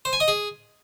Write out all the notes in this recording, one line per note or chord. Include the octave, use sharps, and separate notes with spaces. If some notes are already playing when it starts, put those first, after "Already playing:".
C5
G#5
D#5
G#4